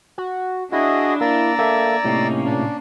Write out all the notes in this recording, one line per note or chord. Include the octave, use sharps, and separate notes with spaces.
F#4
D4 E4 F#4 G#4 D#5
A#3 D5 A#5 E6
A#3 A4 E5 G#6
A2 C3 A#3 C#4 D#4
A#2 D4